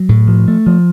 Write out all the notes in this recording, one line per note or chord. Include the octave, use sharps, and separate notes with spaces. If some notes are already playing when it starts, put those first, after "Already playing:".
Already playing: F#3
A2
F3
A3
F3